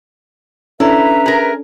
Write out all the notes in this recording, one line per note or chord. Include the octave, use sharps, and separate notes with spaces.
C#4 D4 E4 A4 B4 E5 A#5
G#4 A#4